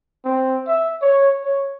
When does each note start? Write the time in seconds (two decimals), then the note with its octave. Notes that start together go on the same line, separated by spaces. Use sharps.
0.25 C4
0.67 E5
1.02 C#5
1.44 C#5